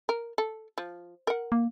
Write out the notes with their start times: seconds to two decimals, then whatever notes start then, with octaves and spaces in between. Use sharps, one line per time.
0.09 A#4
0.38 A4
0.78 F3
1.27 A#4 F#5
1.52 A#3